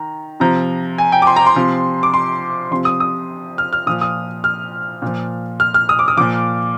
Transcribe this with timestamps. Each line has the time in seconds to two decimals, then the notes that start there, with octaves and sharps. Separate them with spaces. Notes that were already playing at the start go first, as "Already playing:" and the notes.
Already playing: D#3 A#5
0.40 C3 F3 A#5
0.98 G#5
1.12 G5
1.22 D6
1.27 C6
1.36 A#5
1.47 C6
1.56 C3 F3
2.03 D6
2.14 C6
2.71 C3 F3 C6
2.85 D#6
3.00 D#6
3.58 F6
3.73 F6
3.86 A#2 F3 D#6
4.01 D#6
4.44 F6
5.02 A#2 F3
5.60 F6
5.74 F6
5.89 D#6
5.99 D6
6.08 D#6
6.17 A#2 F3 D6